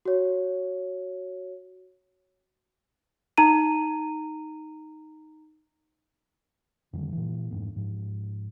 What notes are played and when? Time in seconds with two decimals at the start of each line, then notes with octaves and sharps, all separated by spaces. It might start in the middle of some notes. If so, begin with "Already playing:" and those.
0.05 F#4 C#5
3.37 D#4 A#5 D#7
6.93 F2 D3 D#3 G3
7.12 A#2 E3
7.51 F2 G#2 B3
7.76 G#2 F3